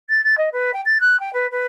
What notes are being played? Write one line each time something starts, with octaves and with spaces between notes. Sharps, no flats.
A6
A6
D#5
B4
G5
A6
F#6
G5
B4
B4